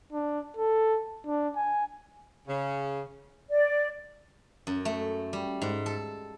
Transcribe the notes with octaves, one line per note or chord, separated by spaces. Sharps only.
D4
A4
D4
G#5
C#3
D5
F#2
A3
G3
G#2
A4